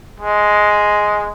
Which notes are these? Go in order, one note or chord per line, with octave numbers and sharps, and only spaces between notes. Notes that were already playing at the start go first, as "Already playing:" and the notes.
G#3